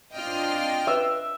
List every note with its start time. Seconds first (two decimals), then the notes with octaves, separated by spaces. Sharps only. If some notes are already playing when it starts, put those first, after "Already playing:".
0.14 C4 D4 F4 D#5 G5 F6
0.87 B4 E5